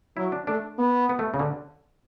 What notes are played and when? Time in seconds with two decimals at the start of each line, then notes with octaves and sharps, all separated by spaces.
0.17 F#3 E4
0.32 D4
0.47 A3 D4
0.78 B3
1.09 B3
1.19 A3
1.34 C#3
1.39 D3